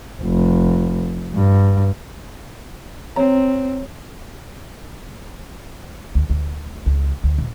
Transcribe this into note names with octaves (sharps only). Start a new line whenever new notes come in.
F1
G2
C4 C#5 A#5
D2
D2
C#2
D2
D#1